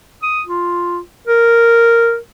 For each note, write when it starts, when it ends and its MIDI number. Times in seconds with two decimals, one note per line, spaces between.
0.23 0.42 87
0.47 1.00 65
1.28 2.17 70